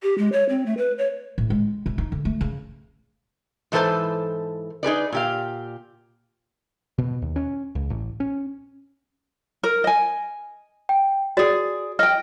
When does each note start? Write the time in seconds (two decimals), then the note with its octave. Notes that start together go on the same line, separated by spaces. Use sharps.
0.03 G4
0.18 G#3
0.32 C#5
0.49 C4
0.66 A3
0.78 B4
0.98 C#5
1.38 A2
1.50 G#3
1.86 C3
1.98 D#4
2.12 D3
2.25 A3
2.41 C#3
3.72 G#2 E3 A4 B4 C5 A5
4.83 D#4 G#4 B4 D5
5.12 A#2 G4 F5
6.98 B2
7.22 D#2
7.36 C#4
7.75 C#2
7.90 A1
8.20 C#4
9.63 A#4
9.84 D#5 G#5
10.89 G5
11.37 F#4 G#4 D5
11.99 D#5 G5 F6